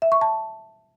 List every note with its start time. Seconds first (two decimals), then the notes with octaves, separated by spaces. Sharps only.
0.02 E5
0.12 C#6
0.21 A5